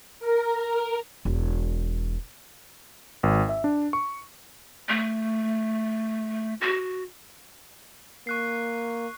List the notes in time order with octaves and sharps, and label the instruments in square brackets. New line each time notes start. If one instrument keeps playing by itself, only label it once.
[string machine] A#4
[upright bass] E1
[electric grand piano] G#1
E5
D4
C#6
[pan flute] A3
F#4
[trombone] A#3 [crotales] C#6 F#6 C7